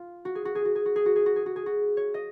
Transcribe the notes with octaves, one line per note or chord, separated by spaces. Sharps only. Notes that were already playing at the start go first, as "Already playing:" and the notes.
Already playing: F4
F#4
G#4
F#4
G#4
F#4
G#4
F#4
G#4
F#4
G#4
F#4
G#4
F#4
G#4
F#4
C#5
D#5